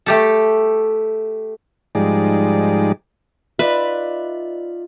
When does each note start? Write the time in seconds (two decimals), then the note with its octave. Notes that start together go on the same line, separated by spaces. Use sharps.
0.06 A3 G4 A4
1.95 G#2 F3 G3 G#3 D#4 D5
3.59 D#4 F4 B4 D5 E5